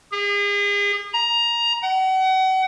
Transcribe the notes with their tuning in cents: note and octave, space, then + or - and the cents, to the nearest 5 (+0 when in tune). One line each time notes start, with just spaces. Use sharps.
G#4 -40
A#5 +15
F#5 +35